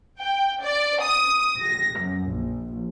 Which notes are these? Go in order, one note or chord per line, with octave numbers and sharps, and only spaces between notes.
G5
D5
D#6
A#6
F#2
A#1